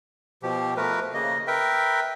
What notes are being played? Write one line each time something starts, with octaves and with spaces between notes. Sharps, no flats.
B2 F3 G4
F3 A3 A#4 B4
C#3 A#3 D#5
A#4 B4 E5 G5